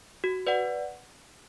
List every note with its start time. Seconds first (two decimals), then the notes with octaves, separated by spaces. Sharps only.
0.24 F#4
0.47 B4 D5 F#5